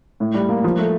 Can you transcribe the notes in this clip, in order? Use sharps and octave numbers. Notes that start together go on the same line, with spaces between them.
A2
G3
A#3
F3
A3